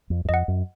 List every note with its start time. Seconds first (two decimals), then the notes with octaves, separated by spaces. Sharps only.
0.10 F2
0.25 F#2
0.29 F2 D#5 F#5
0.48 F#2